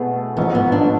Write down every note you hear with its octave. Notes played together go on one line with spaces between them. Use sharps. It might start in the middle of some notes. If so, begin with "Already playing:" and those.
Already playing: B2 A3 B3 E4 G#4
A1 G#2 F3 B3
B3
D4